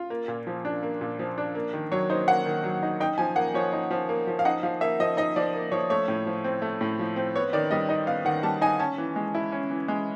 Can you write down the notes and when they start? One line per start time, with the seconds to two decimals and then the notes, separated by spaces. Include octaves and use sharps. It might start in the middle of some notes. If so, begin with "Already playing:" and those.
Already playing: F4
0.10 A#3
0.28 A#2
0.47 F3
0.65 D4
0.83 A#3
1.01 A#2
1.19 F3
1.38 D4
1.55 A#3
1.73 D#3
1.92 F#3 C#5
2.10 D#4 C5
2.28 A#3 F#5
2.45 D#3
2.64 F#3
2.83 D#4
3.00 D#4 G5
3.18 F3 G#5
3.36 A#3 F#5
3.54 F3 C#5
3.73 D#4
3.91 F3
4.09 A#3
4.27 F3
4.39 F5
4.45 D#4 F#5
4.63 F3 F5
4.81 A#3 E5
5.00 F3 D#5
5.17 D#4 D#5
5.36 F3 D5
5.54 A#3
5.72 F3 C#5
5.90 A3 C#5
6.08 A2
6.26 F3
6.44 C4
6.62 A3
6.81 A2
6.99 F3
7.16 C4
7.35 B3 C#5
7.53 D#3 D5
7.71 G3 D#5
7.89 D#4 D#5
8.07 B3 F5
8.25 D#3 F#5
8.43 G3 A5
8.61 D#4 G#5
8.79 C#4 A5
8.98 E3
9.16 G#3
9.34 E4
9.52 C#4
9.71 E3
9.88 G#3